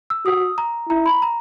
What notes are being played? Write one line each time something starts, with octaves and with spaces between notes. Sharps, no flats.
E6
F#4 D#6
A#5
E4 A#5
B5
A#5